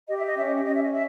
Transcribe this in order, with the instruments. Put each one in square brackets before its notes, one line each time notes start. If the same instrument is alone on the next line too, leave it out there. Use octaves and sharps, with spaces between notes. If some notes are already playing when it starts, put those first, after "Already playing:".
[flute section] G4 D#5
E5
D#5
C#4 E5
D#5
E5
C#4 D#5
E5
D#5
E5